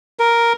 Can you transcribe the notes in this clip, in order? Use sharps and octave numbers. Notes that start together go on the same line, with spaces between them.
A#4